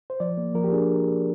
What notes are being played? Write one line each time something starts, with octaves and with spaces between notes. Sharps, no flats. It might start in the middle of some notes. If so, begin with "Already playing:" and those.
C5
F3 D5
A#3
F3 A#4
G4
D4 G#4